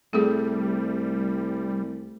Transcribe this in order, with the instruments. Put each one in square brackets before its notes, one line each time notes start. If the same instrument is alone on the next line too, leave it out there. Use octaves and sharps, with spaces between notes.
[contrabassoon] C2 [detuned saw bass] G3 [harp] A3 C4 [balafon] G#4 A4